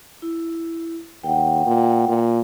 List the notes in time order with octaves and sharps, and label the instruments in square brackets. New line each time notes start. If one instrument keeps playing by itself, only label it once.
[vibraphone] E4
[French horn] D#2 [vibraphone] F#5 G5
[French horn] A#2
A#2